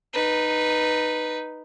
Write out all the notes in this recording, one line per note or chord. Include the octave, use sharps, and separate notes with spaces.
D#4 B4